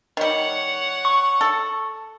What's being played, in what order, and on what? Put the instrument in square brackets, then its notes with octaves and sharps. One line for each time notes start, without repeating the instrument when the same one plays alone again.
[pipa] D#3 G3 [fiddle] C#5 F#5
[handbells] C#6
[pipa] A4